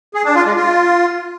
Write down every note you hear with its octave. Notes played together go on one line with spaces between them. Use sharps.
G#4
D4
F4
G#3
F4